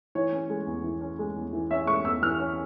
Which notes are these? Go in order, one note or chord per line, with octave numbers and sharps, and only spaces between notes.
E3 C#5
C#4
G#3
E2
E3
C#4
G#3
E2
E3
C#4 E5
G#3 C#6
E2 E6
E3 F6
C#4